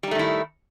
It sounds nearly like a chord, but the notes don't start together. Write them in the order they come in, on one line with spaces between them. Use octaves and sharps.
G3 D#4 A3 D#3 E4